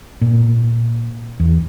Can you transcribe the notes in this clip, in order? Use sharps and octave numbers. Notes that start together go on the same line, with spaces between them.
A#2
E2